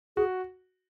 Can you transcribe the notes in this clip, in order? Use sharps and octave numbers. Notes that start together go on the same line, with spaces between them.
F#4 G#4